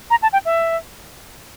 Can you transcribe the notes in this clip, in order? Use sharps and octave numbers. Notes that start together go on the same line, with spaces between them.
A#5
A5
G5
E5